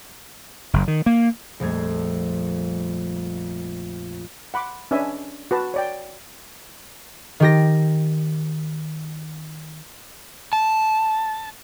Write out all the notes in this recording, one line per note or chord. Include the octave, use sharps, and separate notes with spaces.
F#1
D#3
A#3
A#1 F2 G3 A3 G#6
F#5 B5 C6 D6
C#4 D4 B4 D#5 E5 G#5
F#4 B4 A5
C#5 D5 G5
D#3 G4 A#6
A5